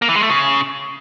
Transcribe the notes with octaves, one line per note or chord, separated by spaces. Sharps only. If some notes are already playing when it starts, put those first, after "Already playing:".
A#3
E3
G#3
A3
C#3